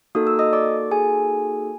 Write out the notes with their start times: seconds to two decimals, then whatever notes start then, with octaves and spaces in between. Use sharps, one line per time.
0.15 A#3 D#4 F#4 A4 D#6
0.27 E6
0.39 D#5 D#6
0.53 D5 D6
0.91 G#4 G#5